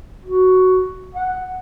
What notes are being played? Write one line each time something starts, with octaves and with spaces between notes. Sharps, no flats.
F#4
F#5